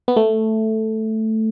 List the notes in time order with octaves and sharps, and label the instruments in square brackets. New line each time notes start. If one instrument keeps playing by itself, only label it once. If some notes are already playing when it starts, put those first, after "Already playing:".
[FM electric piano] B3
A3